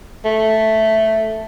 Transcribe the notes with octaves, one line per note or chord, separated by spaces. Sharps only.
A3